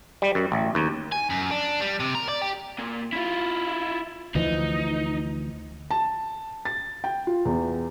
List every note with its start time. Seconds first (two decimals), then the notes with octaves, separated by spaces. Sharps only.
0.22 G3
0.35 F#2
0.52 A1
0.75 D#2
1.12 G#5
1.30 F#2
1.51 D4
1.80 G3
2.00 C3
2.15 A#4
2.29 D5
2.42 G4
2.79 A#2
3.13 E4 F4
4.35 D2 E3 F3 D#4
5.91 A5
6.65 A6
7.04 G5
7.27 F4
7.45 E2